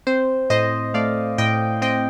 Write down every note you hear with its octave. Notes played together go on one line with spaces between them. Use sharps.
C4 C5
A2 C5 D#5
A3 D5 F5
A2 D#5 G5
C4 D#5 G5